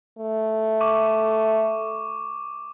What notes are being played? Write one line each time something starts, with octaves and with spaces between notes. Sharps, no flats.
A3
C#6 D6